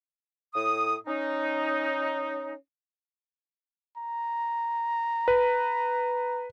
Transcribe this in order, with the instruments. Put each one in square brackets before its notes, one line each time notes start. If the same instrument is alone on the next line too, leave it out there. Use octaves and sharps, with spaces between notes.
[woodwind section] A2 D#6
C#4 D#4
[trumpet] A#5
[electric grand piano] B4